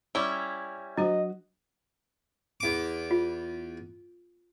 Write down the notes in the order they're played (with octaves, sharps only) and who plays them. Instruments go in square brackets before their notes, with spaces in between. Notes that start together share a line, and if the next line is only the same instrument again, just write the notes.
[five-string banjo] G3 C#4 E4 [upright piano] G7
[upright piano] F#3 [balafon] D4 F#4 C5 [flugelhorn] D#5
[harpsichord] E2 D6
[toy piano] F4